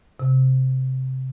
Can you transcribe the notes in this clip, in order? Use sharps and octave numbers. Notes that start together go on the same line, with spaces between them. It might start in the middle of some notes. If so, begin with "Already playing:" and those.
C3